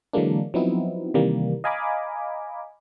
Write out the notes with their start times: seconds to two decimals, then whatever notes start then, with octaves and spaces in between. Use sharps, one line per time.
0.13 D3 E3 F#3 G#3 A#3 D4
0.54 F3 F#3 B3 C4 D#4 E4
1.14 C3 D#3 E3 G3 A#3
1.64 D#5 F5 G#5 A#5 B5 D6